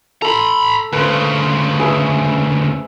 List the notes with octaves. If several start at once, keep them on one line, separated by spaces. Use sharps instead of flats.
A4 A#5 B5
D2 C#3 B4 C5
G#4 B4 E5